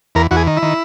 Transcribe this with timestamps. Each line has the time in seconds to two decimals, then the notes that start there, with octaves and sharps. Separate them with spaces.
0.15 E2 A#4
0.31 E2 F#4
0.37 G#4
0.47 D#3
0.57 E4
0.62 D#3